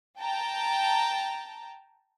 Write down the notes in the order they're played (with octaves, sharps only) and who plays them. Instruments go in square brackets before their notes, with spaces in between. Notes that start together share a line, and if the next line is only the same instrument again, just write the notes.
[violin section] G5 A5 A#5